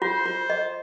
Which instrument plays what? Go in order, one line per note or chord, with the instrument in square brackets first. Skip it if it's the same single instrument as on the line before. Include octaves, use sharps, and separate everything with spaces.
[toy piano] F4 [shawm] C5
[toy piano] F4
D#5